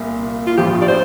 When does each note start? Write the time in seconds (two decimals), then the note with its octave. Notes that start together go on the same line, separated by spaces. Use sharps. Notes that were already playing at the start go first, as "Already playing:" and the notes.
Already playing: C2 A#2
0.47 F4
0.58 A1 G2 F3 G4
0.82 D5
0.88 C5